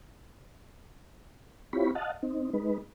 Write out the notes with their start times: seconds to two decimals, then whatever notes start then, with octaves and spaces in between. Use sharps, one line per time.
1.73 C4 E4 F4 G4 C#5 B5
1.95 D#5 F5 F#5 A5
2.23 C4 D#4
2.53 G#3 D#4 B4